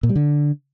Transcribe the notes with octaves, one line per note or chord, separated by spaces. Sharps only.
A#2
G3
D3